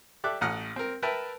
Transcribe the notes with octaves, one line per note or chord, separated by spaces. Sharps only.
G4 A4 D5 E5 D6 F#6
A1 A2 F#5 D#6 F6
C4 A#4
A#4 B4 E5 G5 A5